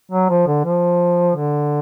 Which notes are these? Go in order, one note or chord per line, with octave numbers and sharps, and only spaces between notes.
F#3
F3
D3
F3
D3